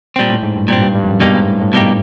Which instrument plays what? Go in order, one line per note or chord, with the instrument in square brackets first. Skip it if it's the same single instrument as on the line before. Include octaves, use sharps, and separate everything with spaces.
[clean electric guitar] A#2 G3 C4
[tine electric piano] A2
G#2
G2
[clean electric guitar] A#2 G3 C4
[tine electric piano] G2
G2
F2
F#2
[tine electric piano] G2 [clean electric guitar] B2 G3 A#3 D#4 G4
[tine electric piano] G#2
A2
A2
[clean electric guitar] B2 G3 A#3 D#4 G4